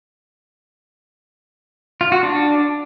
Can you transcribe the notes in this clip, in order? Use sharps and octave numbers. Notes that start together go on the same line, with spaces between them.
F4
F#4
D4